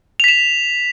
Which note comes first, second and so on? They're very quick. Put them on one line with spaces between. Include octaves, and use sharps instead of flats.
F7 B6 E7